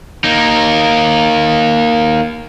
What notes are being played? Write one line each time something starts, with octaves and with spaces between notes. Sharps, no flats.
A#3 D#4